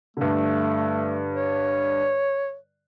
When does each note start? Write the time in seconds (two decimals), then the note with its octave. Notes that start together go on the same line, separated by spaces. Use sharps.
0.17 G2 D3 A3
1.34 C#5